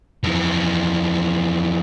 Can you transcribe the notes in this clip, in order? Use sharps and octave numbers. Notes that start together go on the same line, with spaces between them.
F2 E3